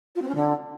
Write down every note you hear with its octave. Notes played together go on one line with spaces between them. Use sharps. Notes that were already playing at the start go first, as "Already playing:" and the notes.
F4
C4
C#4
D3